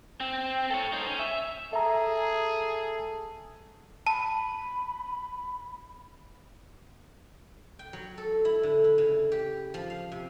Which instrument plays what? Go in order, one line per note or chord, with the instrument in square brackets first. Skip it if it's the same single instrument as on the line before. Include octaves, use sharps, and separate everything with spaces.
[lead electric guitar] C4
A4 C#5
D#4 C5
C#4
E5
[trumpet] G#4 [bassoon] A4 [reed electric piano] E5 A#5
[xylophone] A5 [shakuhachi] B5
[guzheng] G5
F#3
A4
E4
D3
E4
C#3
G4
F3
F5
C3